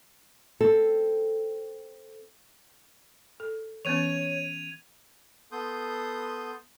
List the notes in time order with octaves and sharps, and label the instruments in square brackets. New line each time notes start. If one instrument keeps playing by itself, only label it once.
[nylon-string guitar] C4 A4
[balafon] A4
[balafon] E3 B3 C#4 [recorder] C#5 [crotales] G#6 D#7 F7
[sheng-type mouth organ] B3 A4 C6 D#6 G6